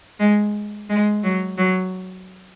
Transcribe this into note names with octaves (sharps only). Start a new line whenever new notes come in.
G#3
G#3
F#3
F#3